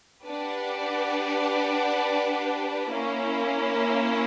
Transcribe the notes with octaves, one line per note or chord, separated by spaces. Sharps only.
D4 G4 B4 D5 F#5
A#3 C#4 E4